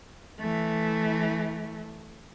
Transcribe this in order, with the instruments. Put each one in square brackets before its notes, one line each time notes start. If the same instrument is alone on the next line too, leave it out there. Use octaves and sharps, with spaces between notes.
[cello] E3 A3